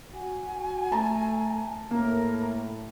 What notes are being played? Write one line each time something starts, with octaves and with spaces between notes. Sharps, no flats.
F#4 G#5
A3 A5 A#5
A2 A#3 A#4